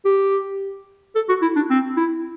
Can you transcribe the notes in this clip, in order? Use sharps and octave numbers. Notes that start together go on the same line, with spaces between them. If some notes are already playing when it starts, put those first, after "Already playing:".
G4
A4
F#4
E4
D4
C4
E4